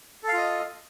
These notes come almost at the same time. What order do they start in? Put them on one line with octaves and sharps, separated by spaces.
A4 F5 F4 D#5